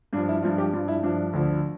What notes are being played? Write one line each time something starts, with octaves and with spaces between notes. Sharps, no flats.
G2 F3 D4
E4
G2 F3 F4
G4
G2 F3 F4
E4
G2 F3 D4
D2 D3 F3